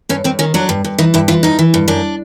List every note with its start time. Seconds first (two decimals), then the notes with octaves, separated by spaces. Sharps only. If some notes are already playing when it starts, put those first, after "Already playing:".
0.09 G2 C#4
0.24 G2 C4
0.39 D#3 C#4
0.54 F#3 D4
0.69 G2
0.84 G2
0.98 E3 D#4
1.14 G2 E4
1.28 E3 F4
1.43 G2 D#4
1.59 E3
1.74 G2
1.88 F#2 D4